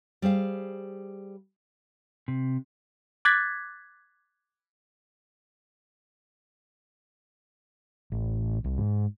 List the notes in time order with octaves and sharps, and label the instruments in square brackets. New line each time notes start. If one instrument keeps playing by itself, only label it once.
[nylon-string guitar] G3 G#4 C5 F5
[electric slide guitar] C3
[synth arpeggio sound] D6 F#6 G#6 A6 B6
[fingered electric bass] A1
C2
G#2